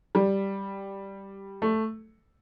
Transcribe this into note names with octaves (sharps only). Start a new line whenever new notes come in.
G3
A3